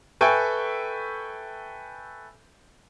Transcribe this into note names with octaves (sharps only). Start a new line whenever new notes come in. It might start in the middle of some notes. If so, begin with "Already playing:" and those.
A4 B4 E5 G5 G#5 C#6